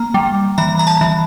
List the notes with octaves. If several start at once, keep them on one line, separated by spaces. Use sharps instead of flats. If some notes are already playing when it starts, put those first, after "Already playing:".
Already playing: A#3 A#5
G3
E3 A#5
A#5
A5
E3